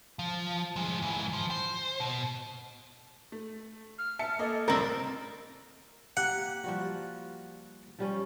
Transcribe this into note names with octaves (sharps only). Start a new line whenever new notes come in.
F3
F3 G#3
G#2 E3
F3
C5
B2
A3
F6
E5 A5 C#7
A#3 A4 D#5
F1 C2 A2 C4 A#4 D5
A#3 G4 F#5
F3 G3 F#4
F3 G3 C#4